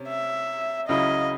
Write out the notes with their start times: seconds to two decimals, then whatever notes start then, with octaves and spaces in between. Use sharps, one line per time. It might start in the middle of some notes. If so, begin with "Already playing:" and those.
Already playing: C3 C#4
0.09 E5
0.88 C#2 C#3 F#3 C#4 E4 D#5